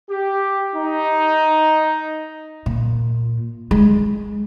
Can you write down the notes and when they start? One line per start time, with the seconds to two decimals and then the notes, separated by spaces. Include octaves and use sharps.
0.10 G4
0.76 D#4
2.66 A#2
3.71 G#3